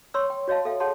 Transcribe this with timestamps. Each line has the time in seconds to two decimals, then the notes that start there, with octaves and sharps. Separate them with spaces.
0.14 C#5 C6 C#6 E6
0.30 G5
0.48 F#4 C#5 D#5 F5 A5
0.65 A4 E5 F5 G5
0.80 G#4 C#5 F#5 A5 C6